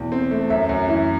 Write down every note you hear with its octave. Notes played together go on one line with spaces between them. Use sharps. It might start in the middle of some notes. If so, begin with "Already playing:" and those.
Already playing: E2 B2
C4
A3
F#2 E5
F#2
E3